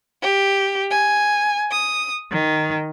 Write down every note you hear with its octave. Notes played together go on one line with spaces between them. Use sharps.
G4
G#5
D#6
D#3